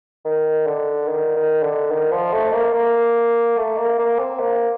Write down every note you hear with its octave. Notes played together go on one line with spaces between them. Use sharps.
D#3
D3
D#3
D#3
D3
D#3
F3
A3
A#3
A#3
A3
A#3
A#3
C4
A#3